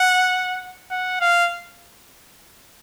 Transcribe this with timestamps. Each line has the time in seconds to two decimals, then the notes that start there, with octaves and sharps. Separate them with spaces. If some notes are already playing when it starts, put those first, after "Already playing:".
Already playing: F#5
0.91 F#5
1.21 F5